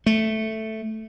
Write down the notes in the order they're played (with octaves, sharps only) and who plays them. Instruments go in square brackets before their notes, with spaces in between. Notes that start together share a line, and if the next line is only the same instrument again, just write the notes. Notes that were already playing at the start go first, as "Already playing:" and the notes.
[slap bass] A3